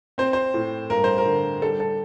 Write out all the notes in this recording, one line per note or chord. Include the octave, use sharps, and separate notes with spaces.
C4 C5
C5
A2
G2 A#4
C5
A#4
D3
G3 A4
A4